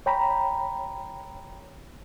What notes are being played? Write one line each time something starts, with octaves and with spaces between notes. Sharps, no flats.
C#5 G5 A#5 B5